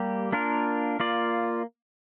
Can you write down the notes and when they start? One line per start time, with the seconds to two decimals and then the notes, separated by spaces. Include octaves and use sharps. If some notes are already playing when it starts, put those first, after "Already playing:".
Already playing: G3 A#3 G4
0.32 A#3 D4 F4 A#4
1.00 A#3 F4 D5